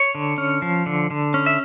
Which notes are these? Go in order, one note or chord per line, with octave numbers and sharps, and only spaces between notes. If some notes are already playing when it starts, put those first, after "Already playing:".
Already playing: C#5
D3
C#4
F3
D3
D3
C#4
E5